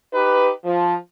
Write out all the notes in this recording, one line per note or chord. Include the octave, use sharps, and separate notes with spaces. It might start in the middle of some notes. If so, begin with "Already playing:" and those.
D#4 G4 B4
F3